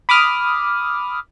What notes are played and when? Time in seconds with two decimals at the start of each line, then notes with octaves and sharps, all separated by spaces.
0.09 B5 D6 D#6 F6